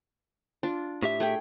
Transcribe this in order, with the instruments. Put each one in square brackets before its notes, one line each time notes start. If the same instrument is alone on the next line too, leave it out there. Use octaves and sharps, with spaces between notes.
[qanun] D4 F4
[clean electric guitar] A2 G4 E5
[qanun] A3 G#4 G5